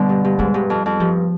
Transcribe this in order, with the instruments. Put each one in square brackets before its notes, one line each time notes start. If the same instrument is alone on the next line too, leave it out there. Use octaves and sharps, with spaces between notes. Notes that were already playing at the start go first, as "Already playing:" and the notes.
Already playing: [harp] B2 D3 [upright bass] G3
[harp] G2
G2
[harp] G#2 [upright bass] G3
[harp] G2
F2
F2
[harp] G2 [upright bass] F3